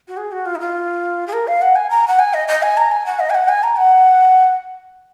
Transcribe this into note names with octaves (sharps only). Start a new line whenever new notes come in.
F#4
G#4
F#4
F4
D#4
F4
G#4
A#4
F5
F#5
G#5
A#5
F#5
G#5
D#5
D#5
G#5
A#5
G#5
F#5
D#5
G#5
F#5
G#5
A#5
F#5